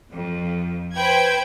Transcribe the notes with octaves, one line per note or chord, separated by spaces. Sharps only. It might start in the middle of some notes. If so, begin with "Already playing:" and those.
F2
B4 C5 G5 B5 G#6